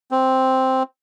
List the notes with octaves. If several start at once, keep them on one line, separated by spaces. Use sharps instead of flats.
C4